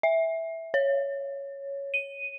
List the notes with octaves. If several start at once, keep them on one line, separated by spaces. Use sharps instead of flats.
E5
C#5
D#7